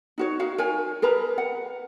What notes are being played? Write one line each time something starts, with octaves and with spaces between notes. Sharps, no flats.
D#4 F#4 C#5
D#4 F#4 F5
A#4 C#5 G#5
G#4 A#4 B4 A#5
F#5